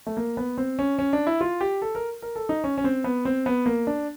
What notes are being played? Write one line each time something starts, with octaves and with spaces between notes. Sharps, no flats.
A3
A#3
B3
C4
C#4
C#4
D4
E4
F4
G4
A4
A#4
A#4
A4
D#4
C#4
C#4
C4
B3
C4
B3
A#3
D4